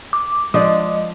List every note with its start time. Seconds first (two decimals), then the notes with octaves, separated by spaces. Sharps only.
0.13 D6
0.54 F3 G#3 D4 D5 D#5 D#6